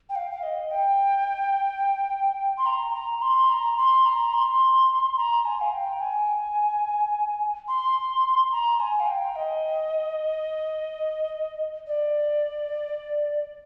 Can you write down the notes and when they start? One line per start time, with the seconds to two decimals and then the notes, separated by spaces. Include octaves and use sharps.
0.09 G5
0.16 F5
0.31 F5
0.43 D#5
0.71 G5
2.58 C6
2.66 A#5
2.94 A#5
3.22 C6
3.50 A#5
3.77 C6
4.06 A#5
4.34 C6
5.17 A#5
5.45 G#5
5.61 F5
5.73 G5
6.01 G#5
7.68 C6
8.52 A#5
8.80 G#5
9.00 F5
9.08 G5
9.36 D#5
11.87 D5